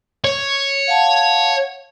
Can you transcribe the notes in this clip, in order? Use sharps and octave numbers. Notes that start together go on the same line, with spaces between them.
C#5
F5 F#5 A5